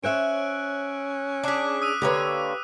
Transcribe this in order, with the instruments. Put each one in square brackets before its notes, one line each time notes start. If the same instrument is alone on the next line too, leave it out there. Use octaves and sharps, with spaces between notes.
[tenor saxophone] C#4 [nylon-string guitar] C5 C#5 E5 [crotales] E6 F#6 D7
[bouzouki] D4 G#4 [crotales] D6 F#6 B6
[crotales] D#6 E6 D#7
[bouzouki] D3 A#3 C#5 [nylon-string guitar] G4 B4